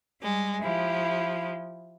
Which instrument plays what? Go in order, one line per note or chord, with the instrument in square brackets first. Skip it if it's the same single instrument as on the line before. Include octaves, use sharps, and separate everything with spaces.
[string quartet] G3 G#3
[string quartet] F3 [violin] E4 G4